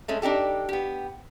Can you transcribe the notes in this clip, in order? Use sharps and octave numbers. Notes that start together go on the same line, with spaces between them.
G#3 A3 C#4
D4 D#4 G4 A4
B3 G4